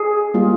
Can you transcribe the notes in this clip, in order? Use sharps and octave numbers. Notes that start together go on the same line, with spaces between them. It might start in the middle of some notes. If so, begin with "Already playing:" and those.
Already playing: G#4
G3 A#3 F4